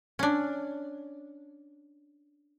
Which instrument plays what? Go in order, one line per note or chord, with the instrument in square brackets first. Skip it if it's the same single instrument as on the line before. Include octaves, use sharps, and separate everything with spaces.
[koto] C#4 D4